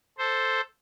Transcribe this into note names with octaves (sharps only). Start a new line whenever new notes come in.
A4 C5